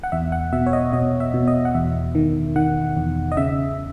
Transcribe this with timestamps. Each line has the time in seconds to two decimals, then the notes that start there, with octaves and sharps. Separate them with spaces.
0.03 F#5
0.12 E2 E5
0.32 F#5
0.53 B2 E5
0.66 C#5
0.73 D#5
0.93 B2 D#5
1.20 E5
1.34 B2
1.48 D#5
1.65 F#5
1.75 E2 E5
2.15 D#3
2.56 D#3 F#5
2.96 E2
3.32 D#5
3.37 C#3 E5